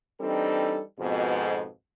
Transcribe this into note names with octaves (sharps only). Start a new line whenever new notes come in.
E3 G3 C4 D4 D#4 A4
F2 G#2 B2